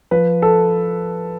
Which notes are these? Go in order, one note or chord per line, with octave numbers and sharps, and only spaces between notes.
F3 B4
A4